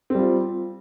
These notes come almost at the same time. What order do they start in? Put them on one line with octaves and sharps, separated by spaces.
C4 G3 F4